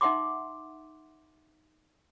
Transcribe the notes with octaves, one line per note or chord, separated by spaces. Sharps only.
D#4 E5 F#5 C6 D6